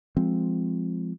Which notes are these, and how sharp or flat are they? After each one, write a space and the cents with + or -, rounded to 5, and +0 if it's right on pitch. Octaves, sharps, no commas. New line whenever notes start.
F3 -10 G#3 -5 C4 +0